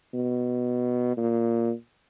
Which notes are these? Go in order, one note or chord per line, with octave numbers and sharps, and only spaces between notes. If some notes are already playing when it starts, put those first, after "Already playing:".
B2
A#2